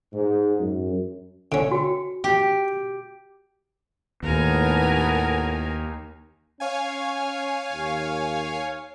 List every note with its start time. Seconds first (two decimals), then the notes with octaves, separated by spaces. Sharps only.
0.12 G#2
0.58 F#2
1.52 D3 C#4
1.72 F#4 G5
2.24 G4
4.23 D#2 A2 B3 A#4 G#5
6.60 C#4 C#5 F5 G#5
7.72 D#2